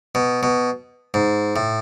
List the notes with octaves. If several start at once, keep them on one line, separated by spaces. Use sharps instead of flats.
B2
B2
G#2
A2